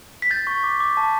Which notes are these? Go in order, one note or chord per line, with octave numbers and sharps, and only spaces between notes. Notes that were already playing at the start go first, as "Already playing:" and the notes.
B6
G6 A6
C#6
D6
D6
A5